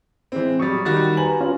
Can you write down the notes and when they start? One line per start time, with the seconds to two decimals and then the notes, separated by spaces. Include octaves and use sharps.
0.32 E3 G#3 C4
0.60 F#3 G3 C#6 D#6 A6
0.85 D#3 G3 F#4 A6
1.17 B4 G#5 A#5 F#7
1.41 C#4 F4